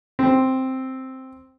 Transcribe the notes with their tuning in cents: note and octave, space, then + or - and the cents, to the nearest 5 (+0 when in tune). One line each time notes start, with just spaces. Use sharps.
C4 +0